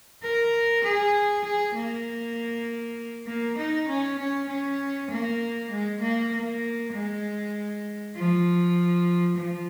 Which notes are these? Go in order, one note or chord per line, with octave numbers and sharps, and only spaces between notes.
A#4
G#4
G#4
A#3
A#3
D#4
C#4
C#4
C#4
A#3
G#3
A#3
A#3
G#3
F3
F3